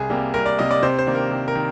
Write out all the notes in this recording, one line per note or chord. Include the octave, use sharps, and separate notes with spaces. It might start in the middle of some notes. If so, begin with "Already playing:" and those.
Already playing: C2 G#4
C3 G3 A#3
C2 A#4
D5
C3 G3 A#3 D#5
D5
C3 C5
C5
D#3 A#3 D4
A#4
C3
A#4
D#3